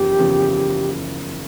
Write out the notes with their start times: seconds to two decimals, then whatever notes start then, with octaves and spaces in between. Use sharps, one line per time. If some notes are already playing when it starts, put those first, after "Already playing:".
Already playing: F#1 E2 C#3 F3 G4
0.18 F#1 E2 C#3 F3